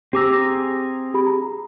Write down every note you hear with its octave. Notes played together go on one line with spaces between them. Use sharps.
C4 G4 G#4 A#5 D6 E6
G4 G#4 B5
A#5